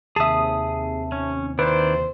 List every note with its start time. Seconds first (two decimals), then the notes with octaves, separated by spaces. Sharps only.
0.16 D#2 C3 G#4 E5 A5 D#6
1.12 C#4
1.59 D#3 E4 B4 C5 D5